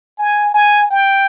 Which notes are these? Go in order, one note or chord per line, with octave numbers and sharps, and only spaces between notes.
G#5
G#5
G5